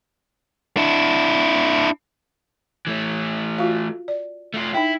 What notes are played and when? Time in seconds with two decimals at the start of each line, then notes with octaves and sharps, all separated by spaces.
0.77 D4 E4
2.87 E3 A3
3.58 F4 F#4 F5
4.08 D5
4.54 A3 F4
4.74 D#4 E4 G5